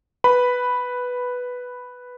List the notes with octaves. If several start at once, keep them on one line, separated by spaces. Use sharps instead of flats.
B4 B5